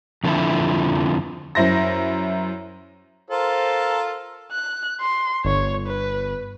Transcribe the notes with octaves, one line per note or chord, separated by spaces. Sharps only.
F2 D3 F3 B3 C4 E4
F#2 E4 C5 A#6
F4 A4 A#4 C5
F#6
C6
G1 C#5
B4